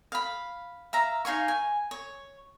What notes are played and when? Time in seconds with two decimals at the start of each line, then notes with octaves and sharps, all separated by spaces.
0.12 F5 B5
0.93 E5 F5 A#5
1.25 D#4 F5 G#5 C#6
1.48 G#5
1.91 C#5